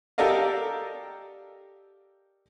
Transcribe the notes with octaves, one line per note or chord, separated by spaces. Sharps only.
G4 A4 A#4 D5 D#5 F5